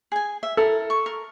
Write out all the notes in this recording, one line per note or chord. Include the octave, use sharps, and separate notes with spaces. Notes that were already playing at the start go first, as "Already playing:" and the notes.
G#4 G#5
E5
E4 A4 A#4
C#6
A#4